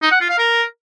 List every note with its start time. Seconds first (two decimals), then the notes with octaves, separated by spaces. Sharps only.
0.02 D#4
0.11 F#5
0.20 F4
0.29 F5
0.38 A#4